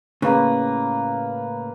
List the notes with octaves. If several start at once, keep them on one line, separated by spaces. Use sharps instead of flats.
A2 C#3 A#3 B4